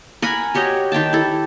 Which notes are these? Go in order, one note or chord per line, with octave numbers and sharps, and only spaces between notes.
A#4 F#5 G#5 B5
F#4 G4 C#5 D#5
D#3 G4 G5 A5
E4 A4